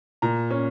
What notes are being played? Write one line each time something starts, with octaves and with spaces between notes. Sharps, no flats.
A#2 A#5
C#4